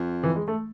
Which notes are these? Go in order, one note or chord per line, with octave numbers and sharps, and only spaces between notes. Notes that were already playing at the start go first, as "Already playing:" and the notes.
Already playing: F2
E3
G#3
A3